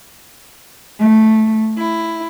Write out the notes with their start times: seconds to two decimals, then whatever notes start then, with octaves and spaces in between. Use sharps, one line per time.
0.99 A3
1.77 E4